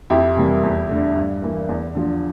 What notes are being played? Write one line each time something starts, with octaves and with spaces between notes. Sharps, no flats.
F2 E4 G4
C3 E3 G3 A#3
E2
D3 A3
G2
E3 A#3
E2
D3 F3